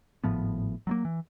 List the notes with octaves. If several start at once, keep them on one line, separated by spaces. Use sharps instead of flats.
G#1 A2 F3 B3
F#3 A3 A#3
E3